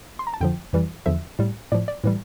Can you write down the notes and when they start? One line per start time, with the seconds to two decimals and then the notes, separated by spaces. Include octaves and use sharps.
0.19 C6
0.27 A#5
0.34 A5
0.41 F2 D3 F3 G5
0.73 F2 E3 G3
1.06 E2 D3 F3 E5
1.39 A2 G3
1.72 A2 F3 D5
1.88 D5
2.04 A2 E3 G3